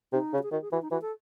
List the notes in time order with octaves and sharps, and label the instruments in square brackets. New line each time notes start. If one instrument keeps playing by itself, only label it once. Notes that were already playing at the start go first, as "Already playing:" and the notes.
[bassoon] C3 [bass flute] D#4
[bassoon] C#3
[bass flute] F#4
G#4
[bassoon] D#3 [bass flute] F#4
[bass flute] G#4
[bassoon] E3 [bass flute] F#4
[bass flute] D#4
[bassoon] E3 [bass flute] F#4
[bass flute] A4